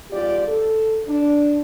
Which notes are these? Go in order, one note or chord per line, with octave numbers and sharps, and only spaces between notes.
F2 G#2 F4 G4 D5
A4
D4